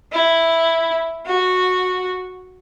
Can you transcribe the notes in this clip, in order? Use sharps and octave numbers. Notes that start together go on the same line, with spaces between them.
E4
F#4